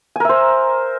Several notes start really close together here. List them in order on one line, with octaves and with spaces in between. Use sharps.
G#5 A#4 E5 C5